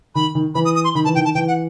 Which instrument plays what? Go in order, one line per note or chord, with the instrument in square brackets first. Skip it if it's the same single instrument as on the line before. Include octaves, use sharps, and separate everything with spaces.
[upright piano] D#3 [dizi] B5
[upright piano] D#3
[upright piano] E3 [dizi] B5
[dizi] D#6
D#6
C6
[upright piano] D#3 [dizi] B5
[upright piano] E3 [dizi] A5
[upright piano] D#3 [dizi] G5
[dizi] A5
[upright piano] E3 [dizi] G5
[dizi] F#5